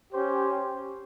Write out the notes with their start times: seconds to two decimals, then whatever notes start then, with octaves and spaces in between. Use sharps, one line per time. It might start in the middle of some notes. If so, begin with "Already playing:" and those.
0.11 C#4 G4 C5